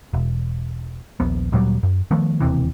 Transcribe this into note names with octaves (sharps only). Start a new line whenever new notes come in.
E1
D#1 A#1 B3
D2 A#2 F#3 G3
F#2
D#3 F3 A3 B3
E1 D#2 C3 E3